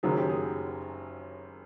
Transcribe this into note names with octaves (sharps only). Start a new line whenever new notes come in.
F#1 F#2 D#3 F#3 G#4
G4
G#4